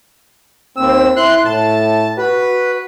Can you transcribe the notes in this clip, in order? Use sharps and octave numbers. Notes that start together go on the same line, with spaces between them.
D#2 C4 E6
E4 C6 F#6
A2 A5
F#4 B4